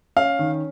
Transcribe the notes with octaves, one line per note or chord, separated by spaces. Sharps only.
C#4 F5
D#3